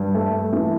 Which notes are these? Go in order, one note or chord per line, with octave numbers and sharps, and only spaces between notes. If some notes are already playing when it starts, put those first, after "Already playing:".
Already playing: G2
A3
E3